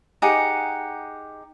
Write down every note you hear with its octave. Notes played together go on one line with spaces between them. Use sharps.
D#4 G4 G#4 F#5